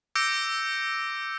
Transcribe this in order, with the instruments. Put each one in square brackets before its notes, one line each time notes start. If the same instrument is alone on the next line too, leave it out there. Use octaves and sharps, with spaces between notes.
[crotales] D6 E6 G6 A#6 C#7 D7